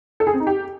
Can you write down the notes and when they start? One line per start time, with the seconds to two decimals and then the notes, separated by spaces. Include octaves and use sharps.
0.20 A4
0.27 G#4
0.33 C4
0.40 D#4
0.47 G4